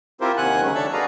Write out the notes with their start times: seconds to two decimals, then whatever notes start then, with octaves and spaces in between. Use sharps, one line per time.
0.21 C4 E4 F4 G4 A#4 C5
0.37 D#2 C3 D#3 F#5 G#5 F#6
0.62 C#3 F#3 G#3 C#4
0.75 D4 A4 C#5 E5 A5 E6
0.93 F#4 G#4 B4 D5 F5 A#5